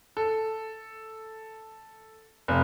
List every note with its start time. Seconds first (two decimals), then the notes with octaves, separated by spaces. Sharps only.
0.17 A4
2.48 F1